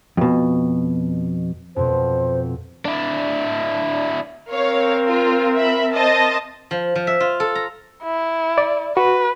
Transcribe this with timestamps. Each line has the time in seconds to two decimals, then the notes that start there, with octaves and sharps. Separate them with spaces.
0.17 F2 B2
1.76 F2 B2 C5
2.85 D4 E4
4.51 C4 A#4 C#5 F5
5.08 F4
5.58 E5 B5
5.96 C5 D#5 A5
6.71 F3
6.96 F3
7.07 E5
7.20 F4
7.40 A4
7.55 A#5
8.03 E4
8.58 D5
8.97 F#4 B4